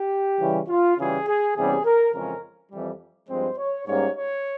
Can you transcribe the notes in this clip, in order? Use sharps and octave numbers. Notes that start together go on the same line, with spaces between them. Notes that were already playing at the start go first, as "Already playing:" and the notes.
Already playing: G4
C#3 E3 G3 C#4
F4
C#3 E3 G3 G#4
G#4
E2 C3 G3 C#4 G#4
A#4
F2 C#3 E3 G#3 C#4 A#4
F2 E3 G3
G2 F3 G#3 C4 C5
C#5
G#2 G3 A#3 C#4 C#5
C#5